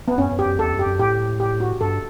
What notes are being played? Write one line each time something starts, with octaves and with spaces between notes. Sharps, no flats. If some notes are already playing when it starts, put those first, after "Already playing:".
B3
F#2 C#4
F#2
G4
F#2
E2 A4
F#2
G4
F#2
A2 G4
G4
F#4
G2 A4